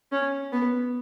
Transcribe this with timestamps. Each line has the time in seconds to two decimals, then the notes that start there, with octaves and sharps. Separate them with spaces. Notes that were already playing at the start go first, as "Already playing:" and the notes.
0.12 C#4
0.52 B3